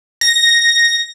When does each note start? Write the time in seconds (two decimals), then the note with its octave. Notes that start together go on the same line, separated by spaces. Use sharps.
0.21 A#6